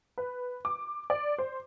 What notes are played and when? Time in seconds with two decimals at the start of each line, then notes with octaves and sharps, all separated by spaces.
0.18 B4
0.65 D6
1.10 D5
1.38 C5